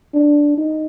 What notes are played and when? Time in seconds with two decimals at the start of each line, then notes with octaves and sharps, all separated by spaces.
0.14 D4
0.57 D#4